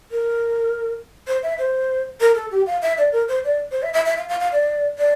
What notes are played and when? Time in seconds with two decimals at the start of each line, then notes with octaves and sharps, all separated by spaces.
0.11 A#4
1.27 C5
1.43 E5
1.58 C5
2.21 A#4
2.35 A4
2.51 G4
2.66 F5
2.82 E5
2.98 D5
3.12 A#4
3.28 C5
3.44 D5
3.71 C5
3.83 E5
3.94 E5
4.05 E5
4.18 F5
4.29 F5
4.40 F5
4.52 D5
4.98 D5